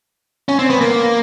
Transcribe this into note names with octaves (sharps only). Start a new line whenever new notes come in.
C#4
C4
B3
A#3